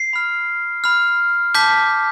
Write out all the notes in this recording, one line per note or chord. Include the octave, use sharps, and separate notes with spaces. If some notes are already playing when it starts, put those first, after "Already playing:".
Already playing: C7
B5 F6
B5 F6
A5 D6 G6 B6